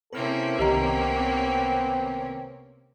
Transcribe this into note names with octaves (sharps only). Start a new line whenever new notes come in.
C3 A#3 C#4 E4 A4 B4 C5 F6
C2 D#3 B3 C4 G4 D#5 A#5